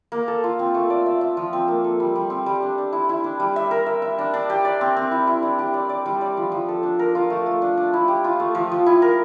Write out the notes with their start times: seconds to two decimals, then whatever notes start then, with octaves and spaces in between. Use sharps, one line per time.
0.12 A#3
0.28 A4
0.44 F4
0.59 C4
0.74 A3
0.90 D5
1.06 E5
1.21 E5
1.37 F3
1.53 C4
1.68 A#3
1.84 A4
2.00 G3
2.15 G3
2.30 C4
2.46 G3
2.62 D4
2.78 D4
2.92 E4
3.09 E4
3.24 D4
3.40 G3
3.56 E5
3.71 A#4
3.86 E5
4.02 E5
4.19 D4
4.34 D4
4.50 G4
4.65 D5
4.81 C4
4.96 C4
5.11 E4
5.27 E4
5.43 D4
5.59 G4
5.74 D5
5.89 D5
6.06 G3
6.21 D5
6.37 F3
6.52 F3
6.68 A4
6.83 D4
6.99 A#4
7.15 F4
7.30 A3
7.46 A3
7.62 D4
7.77 D4
7.93 E4
8.08 G4
8.24 F4
8.40 A3
8.55 F3
8.72 F3
8.86 E4
9.02 A#4